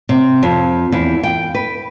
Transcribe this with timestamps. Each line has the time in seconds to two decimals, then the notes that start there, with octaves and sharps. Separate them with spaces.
0.09 C3
0.43 F2
0.92 E2
1.23 G5
1.55 B4